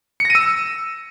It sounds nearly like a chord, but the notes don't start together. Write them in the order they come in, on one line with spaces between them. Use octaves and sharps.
C#7 A#6 D#7 E6